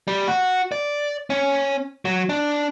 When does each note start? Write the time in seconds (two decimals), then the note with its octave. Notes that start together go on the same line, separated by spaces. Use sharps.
0.08 G3
0.28 F#4
0.72 D5
1.30 C#4
2.05 F#3
2.29 D4